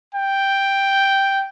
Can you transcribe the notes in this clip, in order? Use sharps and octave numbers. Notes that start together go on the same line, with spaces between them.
G5